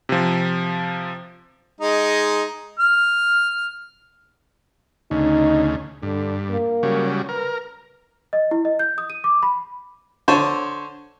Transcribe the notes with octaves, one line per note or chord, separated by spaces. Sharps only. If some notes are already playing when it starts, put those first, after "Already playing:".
C3 F3
G#3 D#4
F6
D2 C#3 D#4
G2 D3
A#3
C#3 F#3 G3
A#4 B4
D#5
E4
D#5
G6
D#6
D#7
D6
B5
D3 C5 C#5 A5